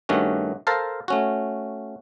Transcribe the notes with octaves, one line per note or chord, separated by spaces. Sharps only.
G2 D#3 A3 C#4 F#4
A4 A#4 C5 F5 A5 A#5
A3 C#4 F#4